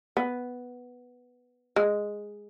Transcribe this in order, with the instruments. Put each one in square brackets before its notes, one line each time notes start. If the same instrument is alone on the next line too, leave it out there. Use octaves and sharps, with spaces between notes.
[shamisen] B3
G#3